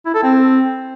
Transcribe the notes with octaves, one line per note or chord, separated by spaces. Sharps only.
E4
A4
C4